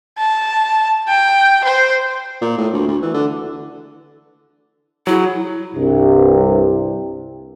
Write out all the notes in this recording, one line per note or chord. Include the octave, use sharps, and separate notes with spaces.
A5
G5
C5
A#2
A2
D2
D2
E3
D3
F#3 E4 G#4
C2 G2 C3